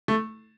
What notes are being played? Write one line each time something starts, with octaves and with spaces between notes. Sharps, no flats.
A3